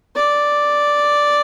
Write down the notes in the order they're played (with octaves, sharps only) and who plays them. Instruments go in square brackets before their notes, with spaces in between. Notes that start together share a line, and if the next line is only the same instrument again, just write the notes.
[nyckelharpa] D5